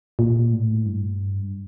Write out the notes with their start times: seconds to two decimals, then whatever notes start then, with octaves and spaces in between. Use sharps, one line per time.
0.19 A#2
0.52 A2
0.86 G2